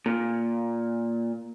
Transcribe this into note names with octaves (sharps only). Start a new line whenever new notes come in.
A#2